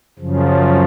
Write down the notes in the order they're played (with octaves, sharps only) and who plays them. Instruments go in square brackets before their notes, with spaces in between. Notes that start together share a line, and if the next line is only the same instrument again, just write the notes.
[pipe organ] F#2 C#3 F3